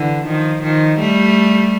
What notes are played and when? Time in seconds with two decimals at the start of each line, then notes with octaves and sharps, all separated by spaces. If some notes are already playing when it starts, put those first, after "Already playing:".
Already playing: D3 E3
0.27 D#3 F3
0.63 D#3 F3
0.99 G3 A3